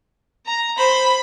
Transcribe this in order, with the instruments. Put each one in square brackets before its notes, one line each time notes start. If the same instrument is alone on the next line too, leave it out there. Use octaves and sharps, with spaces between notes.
[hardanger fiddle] A#5
[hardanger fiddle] C5 [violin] B5